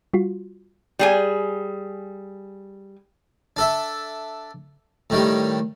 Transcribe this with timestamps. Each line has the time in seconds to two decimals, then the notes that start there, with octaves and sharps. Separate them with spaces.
0.14 G3 F4 F#4
0.99 G3 G#4 G#5
3.57 D4 A4 E5
5.10 A2 D#3 G3